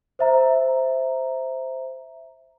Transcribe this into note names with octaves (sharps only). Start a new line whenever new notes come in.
C5 E5 A#5